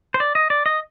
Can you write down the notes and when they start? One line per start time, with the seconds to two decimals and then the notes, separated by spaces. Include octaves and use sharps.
0.14 C5
0.20 D5
0.35 D#5
0.50 D5
0.66 D#5